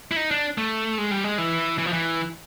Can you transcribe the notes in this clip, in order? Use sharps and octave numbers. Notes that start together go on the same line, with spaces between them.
E4
D#4
D4
A3
G#3
G3
G#3
E3
E3
F3
E3